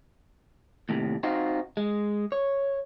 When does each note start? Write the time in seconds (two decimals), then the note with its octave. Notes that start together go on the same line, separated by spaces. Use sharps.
0.89 D#2 A2 C3
1.23 C4 D#4 F4 F#4
1.77 G#3
2.32 C#5